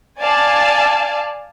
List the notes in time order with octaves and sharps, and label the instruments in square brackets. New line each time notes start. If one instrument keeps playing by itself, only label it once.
[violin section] D5 F5 G#5 A5